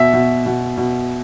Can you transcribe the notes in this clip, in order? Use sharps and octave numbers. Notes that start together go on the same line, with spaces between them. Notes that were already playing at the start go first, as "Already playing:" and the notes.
Already playing: B2 E5
B2
B2
B2